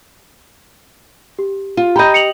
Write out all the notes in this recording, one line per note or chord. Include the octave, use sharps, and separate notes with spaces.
G4
F4
G4 D#5 A#5 B5 G6
C#7 F7 F#7